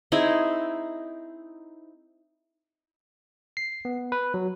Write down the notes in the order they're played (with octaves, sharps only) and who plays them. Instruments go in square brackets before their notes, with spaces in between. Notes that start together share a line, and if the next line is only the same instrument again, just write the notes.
[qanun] C4 D#4 E4 G#4
[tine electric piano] C7
B3
B4
F#3